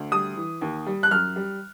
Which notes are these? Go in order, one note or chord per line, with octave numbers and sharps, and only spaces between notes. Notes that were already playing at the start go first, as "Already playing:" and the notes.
Already playing: D2
G3 D#6
E3
D#2
G3
F#6
F#2 F6
G3